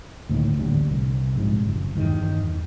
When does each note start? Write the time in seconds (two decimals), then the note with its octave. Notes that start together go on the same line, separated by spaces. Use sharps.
0.29 D2 A2 D#3 A#3
0.57 A1 D3 G3
0.91 C2
1.36 A#1 G#2 C3
1.65 F#1
1.96 E2 G2 D#3 G3